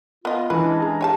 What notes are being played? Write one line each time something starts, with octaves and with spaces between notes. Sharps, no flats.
B3 F4 D#5
E3 G#3 C#4 D4 B4
G#4 A#5
G4 C#5 G#5 A5